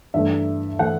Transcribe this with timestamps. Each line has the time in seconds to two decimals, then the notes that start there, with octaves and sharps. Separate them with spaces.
0.14 G2 E3 A3 E5
0.79 E3 A3 F#5